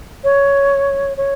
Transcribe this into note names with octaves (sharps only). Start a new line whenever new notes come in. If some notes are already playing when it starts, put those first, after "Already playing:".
C#5
C#5